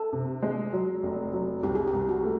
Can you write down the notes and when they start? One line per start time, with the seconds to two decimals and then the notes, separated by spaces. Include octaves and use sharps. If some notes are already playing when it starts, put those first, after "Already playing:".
Already playing: A4
0.13 C3
0.43 G#3
0.73 F#3
1.03 F1
1.33 F#3
1.63 C2 G4
1.75 G#4
1.87 G4
1.93 C2
2.09 F#4
2.24 A3